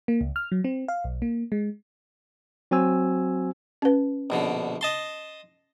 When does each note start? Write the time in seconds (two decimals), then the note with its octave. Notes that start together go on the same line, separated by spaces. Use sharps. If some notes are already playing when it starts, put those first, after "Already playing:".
0.08 A#3
0.21 C#2
0.36 F6
0.52 F#3
0.64 C4
0.88 F5
1.04 B1
1.22 A#3
1.52 G#3
2.71 F#3 C4 F#4 C5 G#5 E6
3.82 C#4 B4
4.30 A#1 B2 D3
4.81 D#5 A5 C6